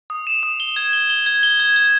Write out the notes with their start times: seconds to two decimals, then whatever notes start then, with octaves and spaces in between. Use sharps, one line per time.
0.10 D#6
0.27 E7
0.43 D#6
0.60 G7
0.76 G#6
0.93 G7
1.10 G7
1.26 G#6
1.43 G7
1.60 G#6
1.76 G#6